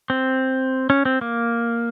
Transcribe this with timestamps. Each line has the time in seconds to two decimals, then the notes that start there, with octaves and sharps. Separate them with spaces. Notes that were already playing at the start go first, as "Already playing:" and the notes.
0.10 C4
0.90 C#4
1.05 C4
1.21 A#3